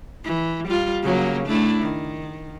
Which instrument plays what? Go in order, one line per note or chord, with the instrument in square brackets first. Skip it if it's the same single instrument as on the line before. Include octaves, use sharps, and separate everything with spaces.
[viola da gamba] E3
G3 F4
C#3 F#3 A#3
A3 D4 E4
D#3